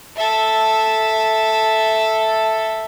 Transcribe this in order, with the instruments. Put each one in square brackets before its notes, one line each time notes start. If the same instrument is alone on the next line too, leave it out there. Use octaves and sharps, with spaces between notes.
[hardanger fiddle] A4 E5